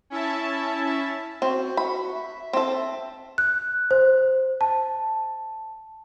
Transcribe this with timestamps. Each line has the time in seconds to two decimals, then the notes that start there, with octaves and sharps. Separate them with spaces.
0.10 C#4 E4 E5 A5
1.42 C4 F#4
1.77 B5
2.13 E5
2.53 C4 A4
3.38 F#6
3.91 C5
4.61 A5